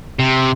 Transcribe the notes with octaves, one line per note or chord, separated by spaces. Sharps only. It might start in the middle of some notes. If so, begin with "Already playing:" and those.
C3